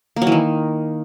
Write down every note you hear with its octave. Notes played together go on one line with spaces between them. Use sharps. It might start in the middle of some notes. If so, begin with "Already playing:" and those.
A#3
F#3
E3
D#3